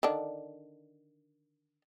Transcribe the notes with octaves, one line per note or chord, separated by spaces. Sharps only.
D3 D#3 D4